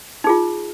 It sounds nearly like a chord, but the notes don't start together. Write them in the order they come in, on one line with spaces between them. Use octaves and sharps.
D#4 G#4 F4